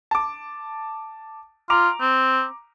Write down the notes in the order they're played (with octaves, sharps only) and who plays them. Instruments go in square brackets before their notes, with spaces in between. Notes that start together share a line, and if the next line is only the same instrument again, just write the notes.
[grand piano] A5 D6
[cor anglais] F4 [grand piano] A#5 D6 F7
[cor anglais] C4